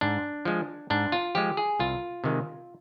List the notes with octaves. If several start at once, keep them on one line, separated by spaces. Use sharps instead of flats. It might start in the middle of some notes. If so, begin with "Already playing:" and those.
G#2 D4
F3 G#3
G#2 D4
F4
F3 G#3 G4
G#4
C2 F4
C3 D#3 G#3